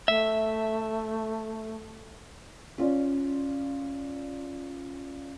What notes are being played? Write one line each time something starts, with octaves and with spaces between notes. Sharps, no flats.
A3 E5
C#4 F4 D5